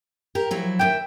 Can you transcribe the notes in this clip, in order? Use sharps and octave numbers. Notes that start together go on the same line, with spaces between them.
G4 A#4
F3 F#3 E4
D#2 G#2 E5 G5